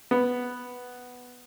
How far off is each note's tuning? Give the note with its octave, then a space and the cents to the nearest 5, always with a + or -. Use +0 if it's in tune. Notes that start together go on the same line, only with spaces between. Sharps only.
B3 +0